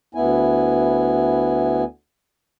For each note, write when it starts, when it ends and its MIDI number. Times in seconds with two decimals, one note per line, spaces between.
0.15 1.84 38
0.15 1.84 59
0.15 1.84 64
0.15 1.84 80